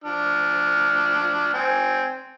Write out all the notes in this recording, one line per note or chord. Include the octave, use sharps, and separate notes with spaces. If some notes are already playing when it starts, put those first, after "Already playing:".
F3 D4 F6
C4 G#5